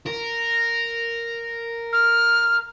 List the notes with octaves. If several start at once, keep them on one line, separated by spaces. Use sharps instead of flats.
A#4
F6